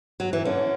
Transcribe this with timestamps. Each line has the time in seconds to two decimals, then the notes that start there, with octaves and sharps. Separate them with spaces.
0.20 F#3
0.33 E3
0.45 D3 C#4